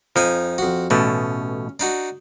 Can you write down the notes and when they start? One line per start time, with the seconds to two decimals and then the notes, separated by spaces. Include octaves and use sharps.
0.16 F2 F3 D#4 G#5
0.58 F2 F#4
0.90 A1 B2 A3 C#4
1.80 D4 D#4 F#4